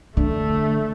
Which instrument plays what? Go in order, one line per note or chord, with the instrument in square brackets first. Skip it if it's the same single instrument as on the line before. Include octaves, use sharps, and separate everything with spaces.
[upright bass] D3 [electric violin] A3